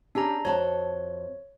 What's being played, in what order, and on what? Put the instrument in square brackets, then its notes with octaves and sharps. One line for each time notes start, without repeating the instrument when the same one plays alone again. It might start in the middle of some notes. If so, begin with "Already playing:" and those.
[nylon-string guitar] C#4 G4 G#4 [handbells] D4 A#5
[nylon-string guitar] F2 F#4 A5 [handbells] C#5